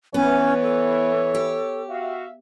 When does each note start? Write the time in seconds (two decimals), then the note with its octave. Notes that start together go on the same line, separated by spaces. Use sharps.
0.14 E3 B3 C#4 C#5
0.62 A4
1.35 G4
1.89 F#4 E5 F5